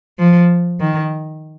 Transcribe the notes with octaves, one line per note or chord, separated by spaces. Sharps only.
F3
D#3